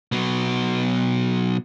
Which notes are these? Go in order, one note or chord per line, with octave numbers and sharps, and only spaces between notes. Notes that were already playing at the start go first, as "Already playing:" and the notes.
B2 F#3